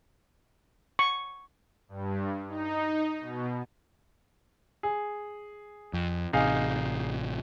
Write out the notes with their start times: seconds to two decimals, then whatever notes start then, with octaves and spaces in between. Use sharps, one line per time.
0.99 C#6
1.89 G2
2.48 D#4
3.20 B2
4.83 G#4
5.93 F2
6.33 A1 C3 D#4 G#4 F5